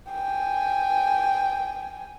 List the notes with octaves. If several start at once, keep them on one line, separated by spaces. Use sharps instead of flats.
G5 G#5